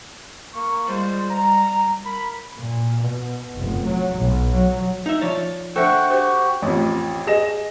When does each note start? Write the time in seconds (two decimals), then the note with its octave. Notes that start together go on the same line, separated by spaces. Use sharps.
0.55 A#3 C#6
0.88 G3 G#3 F4 C5
1.31 A#5
2.05 A#4 B5
2.57 A#2
3.00 B2
3.55 F1
3.85 F#3
4.15 B1
4.53 F#3
5.06 D#4 E5
5.21 F3 C#5 D5
5.76 D4 A4 C5 E5 F#5 G5 C#6
6.11 F#4 G4 C5
6.62 A1 F2
7.27 G#4 D#5 A#6 E7